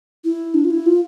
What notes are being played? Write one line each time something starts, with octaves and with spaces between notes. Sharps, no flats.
E4
D4
F4
E4
F4